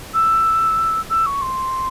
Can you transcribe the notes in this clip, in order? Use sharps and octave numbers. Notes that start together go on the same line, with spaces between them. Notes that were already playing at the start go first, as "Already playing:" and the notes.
E6
E6
C#6
C6